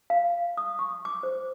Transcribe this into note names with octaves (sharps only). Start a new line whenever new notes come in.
F5
D#6
C#6
D6
C5